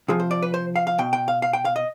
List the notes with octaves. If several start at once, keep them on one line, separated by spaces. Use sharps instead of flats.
C3 F3 G#4
C5
D5
B4
C5
F5
F5
B2 G5
G5
F5
F5
G5
F5
D#5